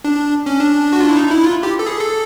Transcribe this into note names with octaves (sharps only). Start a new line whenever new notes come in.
D4
C#4
D4
F#4
F4
E4
D#4
E4
F4
G4
A4
G#4
A4